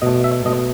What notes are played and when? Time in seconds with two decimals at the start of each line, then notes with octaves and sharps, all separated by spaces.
0.02 B2 A3 D#5
0.24 E5
0.45 B2 A3 D#5